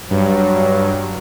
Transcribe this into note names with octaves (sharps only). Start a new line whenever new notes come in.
G2 F#3